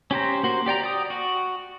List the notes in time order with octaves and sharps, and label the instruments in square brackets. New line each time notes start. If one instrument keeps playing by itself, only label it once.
[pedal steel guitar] C#4 G4 C5 A#5
A#3 F#4 C5
G4 D5 G5 A#5
D5 G5 D#6
F#4